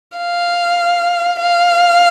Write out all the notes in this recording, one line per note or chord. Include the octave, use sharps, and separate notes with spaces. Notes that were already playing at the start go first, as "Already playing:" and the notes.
F5
F5